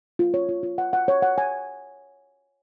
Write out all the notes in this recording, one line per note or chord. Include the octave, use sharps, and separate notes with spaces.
F4
C#5
F4
F4
F#5
F#5
C#5
F#5
G#5